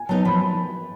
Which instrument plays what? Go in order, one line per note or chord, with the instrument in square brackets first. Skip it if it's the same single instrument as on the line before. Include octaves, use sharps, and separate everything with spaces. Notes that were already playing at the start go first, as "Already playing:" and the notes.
Already playing: [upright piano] G#5
[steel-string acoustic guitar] F#3 B3 D#4 [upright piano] A5
[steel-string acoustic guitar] F3 [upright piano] B5